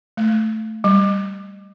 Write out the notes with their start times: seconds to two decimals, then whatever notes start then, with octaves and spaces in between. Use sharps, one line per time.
0.17 A3
0.84 G3